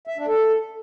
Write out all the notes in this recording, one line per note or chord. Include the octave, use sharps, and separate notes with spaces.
E5
D4
A4